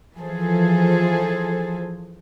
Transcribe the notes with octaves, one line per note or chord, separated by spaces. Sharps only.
E3 F3 F4 G#4 A4 C5